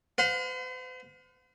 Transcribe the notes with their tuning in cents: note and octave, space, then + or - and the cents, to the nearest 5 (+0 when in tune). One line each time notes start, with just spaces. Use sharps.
C5 -45 F5 +45